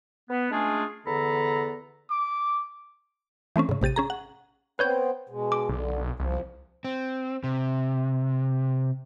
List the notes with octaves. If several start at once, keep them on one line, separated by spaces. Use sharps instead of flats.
B3
G#3 A3 C#4 D4 F4 G#4
E2 D3 B3 A4 A#5 B5
D6
E3 A3 C4 C#4
G#2 C#3
A1 C3 G4 A6 D#7
C#4 G#4 A#5
F#5
B3 C4 B4 C#5 G6
B2 G#3
D6
B1 D3
C2 F3
C4
C3